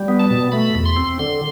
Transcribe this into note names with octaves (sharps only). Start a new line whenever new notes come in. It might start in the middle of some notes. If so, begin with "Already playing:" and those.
Already playing: G3
B3
A5
B2
A3 B5
E2
C6
C4
D3 C6